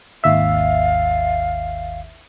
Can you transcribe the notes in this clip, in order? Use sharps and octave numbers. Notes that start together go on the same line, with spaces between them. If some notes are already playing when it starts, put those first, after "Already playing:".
G#1 D#2 E5 F5